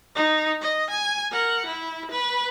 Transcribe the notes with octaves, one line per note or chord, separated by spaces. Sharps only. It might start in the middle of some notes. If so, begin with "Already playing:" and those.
D#4
D#5
G#5
A#4 F#5
E4
B4